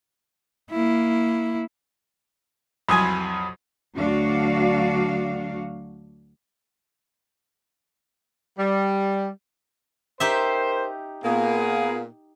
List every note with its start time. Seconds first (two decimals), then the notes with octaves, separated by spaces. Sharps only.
0.71 A#3 E4
2.89 C2 F2 F#3 G#5 B5 C6 D#6 G#6
3.95 D2 F#3 D4 F#4 F5
8.59 G3
10.20 D#4 G4 A#4 C5 E5
11.24 A#2 A#3 B3 G#4